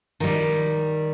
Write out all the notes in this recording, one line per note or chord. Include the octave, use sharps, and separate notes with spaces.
D#3 G3